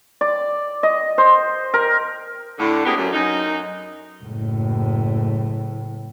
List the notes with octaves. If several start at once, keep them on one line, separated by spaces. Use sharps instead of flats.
D5
D#5
C5
A#4
A2 D3
D2 C3 A#3 B3 G4 G#4
F#2
F#2 D#4
F#1 A2